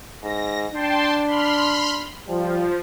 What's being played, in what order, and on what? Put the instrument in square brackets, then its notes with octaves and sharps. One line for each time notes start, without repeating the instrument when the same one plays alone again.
[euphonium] G#2 [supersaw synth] A#6
[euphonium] D4 [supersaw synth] G5 A5 C6
[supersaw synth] B5 C6 F6
[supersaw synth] F3 [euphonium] G3